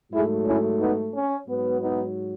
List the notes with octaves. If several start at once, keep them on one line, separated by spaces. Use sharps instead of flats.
G#2 F#3 A3 E4 G#4
C#4 E4
B3 D#4
C#4
G#2 F#3 B3
B3 D#4